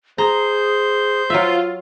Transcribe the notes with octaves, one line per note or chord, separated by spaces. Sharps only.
G#4 C5 A#5 G6
F#3 F4 E5